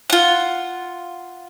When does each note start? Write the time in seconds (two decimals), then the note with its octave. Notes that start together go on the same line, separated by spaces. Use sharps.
0.10 F4 F#5